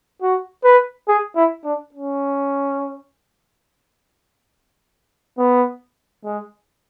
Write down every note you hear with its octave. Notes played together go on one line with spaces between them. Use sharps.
F#4
B4
G#4
E4
D4
C#4
B3
G#3